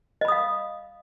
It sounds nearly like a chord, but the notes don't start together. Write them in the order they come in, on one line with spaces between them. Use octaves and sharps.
D#5 B5 D#6 F5